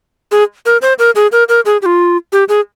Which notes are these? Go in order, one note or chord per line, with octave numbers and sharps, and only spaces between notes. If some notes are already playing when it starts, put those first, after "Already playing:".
G#4
A#4
C5
A#4
G#4
A#4
A#4
G#4
G4
F4
G4
G#4